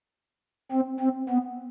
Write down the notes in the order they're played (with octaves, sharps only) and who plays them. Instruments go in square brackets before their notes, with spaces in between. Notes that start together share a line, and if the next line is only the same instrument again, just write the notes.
[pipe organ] C4
C4
B3